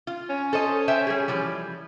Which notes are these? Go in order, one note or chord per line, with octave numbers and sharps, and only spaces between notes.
F4
C#4
A4 C5 D#5
C5 E5 G5
G3 G#4
E3 F3 G3